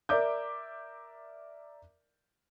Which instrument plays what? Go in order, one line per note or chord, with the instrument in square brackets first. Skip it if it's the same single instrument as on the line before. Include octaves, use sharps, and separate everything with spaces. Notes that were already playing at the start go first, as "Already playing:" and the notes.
[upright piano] A#4 D5 E5 D6 G6